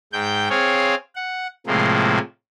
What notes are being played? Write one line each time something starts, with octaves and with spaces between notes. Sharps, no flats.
G#2 G5 G6
C4 G#4 C#5 F5
F#5
A2 C3 F3 G#3 A#3